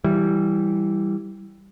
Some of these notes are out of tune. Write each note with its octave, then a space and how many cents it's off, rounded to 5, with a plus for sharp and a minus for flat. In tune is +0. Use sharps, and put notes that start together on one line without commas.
E3 +0 G3 +0